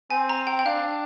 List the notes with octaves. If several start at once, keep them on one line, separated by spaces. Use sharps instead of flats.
C4 G#5
A#5
G5
G5
D4 F5